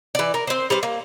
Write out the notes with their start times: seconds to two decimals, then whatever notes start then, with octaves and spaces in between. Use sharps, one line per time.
0.15 E3 D5
0.34 A#4
0.47 C4 C5
0.70 G3 B4 C5
0.83 A#3